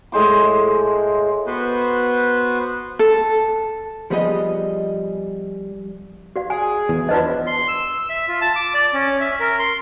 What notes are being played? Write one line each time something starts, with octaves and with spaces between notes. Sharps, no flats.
A2 G#3 C5 D6
B3 F#4 B4 C5
A4
F3 G3 B3 G#4 D#5
F#4 D5 F5
G#4 G#5
E2
F3 F#3 D4 F4 B4 D#5
C6
E6
E5
F4
A5
D6
D5
C#4
E5
A#4
C6